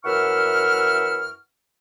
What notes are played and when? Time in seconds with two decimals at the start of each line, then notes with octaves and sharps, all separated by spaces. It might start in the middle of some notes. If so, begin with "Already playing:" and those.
0.05 F#2 E3 E5 F#5 C#6 F6